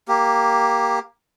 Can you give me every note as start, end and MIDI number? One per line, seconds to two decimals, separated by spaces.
0.08 0.99 58
0.08 0.99 67